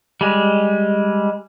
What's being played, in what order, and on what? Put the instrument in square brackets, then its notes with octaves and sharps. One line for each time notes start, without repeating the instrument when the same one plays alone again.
[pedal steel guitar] G3 G#3